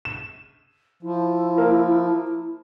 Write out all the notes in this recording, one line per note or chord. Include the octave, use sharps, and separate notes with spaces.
E7
F3 E4
A#3 A#4